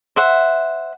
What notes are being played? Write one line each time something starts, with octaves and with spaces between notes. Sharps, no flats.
C5 E5 F#5